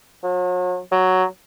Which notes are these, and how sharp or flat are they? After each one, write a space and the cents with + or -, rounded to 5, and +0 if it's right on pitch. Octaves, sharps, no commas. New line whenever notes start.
F#3 -40
F#3 +5